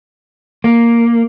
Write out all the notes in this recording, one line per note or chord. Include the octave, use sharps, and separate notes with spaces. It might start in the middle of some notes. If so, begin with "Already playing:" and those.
A#3